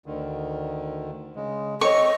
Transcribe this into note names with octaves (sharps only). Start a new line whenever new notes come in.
D2 D3 D#3
C#3 G#3
C4 A4 C#5 D#5 C#6